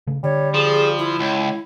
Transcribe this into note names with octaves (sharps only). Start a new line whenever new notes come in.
C#3 A3
D3 G3 C#5
F3 G#4
E4
C#2